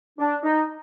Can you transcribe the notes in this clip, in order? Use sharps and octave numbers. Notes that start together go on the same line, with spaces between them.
D4
D#4